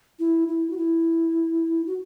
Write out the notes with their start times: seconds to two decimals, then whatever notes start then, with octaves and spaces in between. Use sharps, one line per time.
0.19 E4
0.48 E4
0.70 F#4
0.77 E4
1.87 F#4